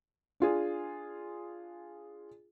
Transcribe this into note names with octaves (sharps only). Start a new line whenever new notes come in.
D4 F4 G#4